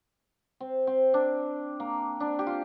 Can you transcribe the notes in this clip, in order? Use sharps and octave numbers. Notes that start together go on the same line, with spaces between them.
C4
C4
D4
A#3
D4
G4
F4